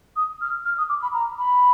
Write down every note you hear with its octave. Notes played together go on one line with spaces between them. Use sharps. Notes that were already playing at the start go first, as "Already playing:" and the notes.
D#6
F6
F6
D#6
D6
B5
A#5
B5